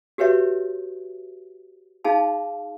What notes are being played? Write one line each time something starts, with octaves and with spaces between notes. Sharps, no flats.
F#4 G4 B4 C#5 E5
D#4 G#4 F5 A5 B5